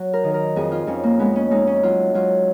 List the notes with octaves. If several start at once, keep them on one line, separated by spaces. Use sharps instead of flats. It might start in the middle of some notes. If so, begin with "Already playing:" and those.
Already playing: F#3
A#4
D#3
A#4
F2 G#4
F4
F2 C#4
A#3
G#3 B3
C#4
G#3 D#4
C#4
F#3 F4
F#3 F4